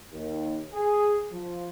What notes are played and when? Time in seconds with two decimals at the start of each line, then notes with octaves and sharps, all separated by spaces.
0.11 D#2
0.73 G#4
1.32 F3